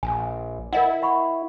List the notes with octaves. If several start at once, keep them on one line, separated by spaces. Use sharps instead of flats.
A#1 G#5
E4 A#4 D#5 F#5
F#5 B5 C#6